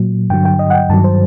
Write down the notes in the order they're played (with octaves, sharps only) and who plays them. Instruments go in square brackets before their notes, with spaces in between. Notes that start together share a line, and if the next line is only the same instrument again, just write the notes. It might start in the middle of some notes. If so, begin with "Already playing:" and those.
Already playing: [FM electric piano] A#2 F#3
G2 D3 F#3 G5
G5
D#5
F#5
G5
G2 D#3 F#3 A5
C5